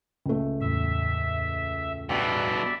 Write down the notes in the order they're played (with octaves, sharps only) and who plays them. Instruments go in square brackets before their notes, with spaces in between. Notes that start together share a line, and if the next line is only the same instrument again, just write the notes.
[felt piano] C#2 A3
[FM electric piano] E2 A2 [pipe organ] E5
[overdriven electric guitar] G2 B2 [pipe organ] D5 E5